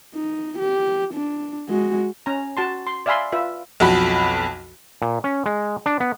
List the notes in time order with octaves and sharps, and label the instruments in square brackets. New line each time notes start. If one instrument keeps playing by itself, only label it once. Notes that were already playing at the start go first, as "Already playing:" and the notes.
[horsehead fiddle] D#4
G4
D4
G#3 F#4
[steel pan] C#4 A#5
F#4 A5 C6
C6
D5 E5 F5 G#5 B5 C6
F4 B4 E5
[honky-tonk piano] B1 F2 F#4 B5
[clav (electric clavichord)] A#2
C#4
G#3
D4
B3